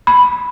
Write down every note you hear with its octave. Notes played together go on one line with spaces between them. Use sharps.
B5